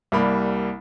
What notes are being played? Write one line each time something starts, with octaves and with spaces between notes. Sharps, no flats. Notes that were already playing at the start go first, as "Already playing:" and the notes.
C2 G3 A#3 B5